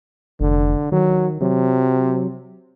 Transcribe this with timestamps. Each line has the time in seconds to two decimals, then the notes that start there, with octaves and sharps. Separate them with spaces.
0.40 F1 D3
0.92 D#3 F#3
1.42 C3 F#3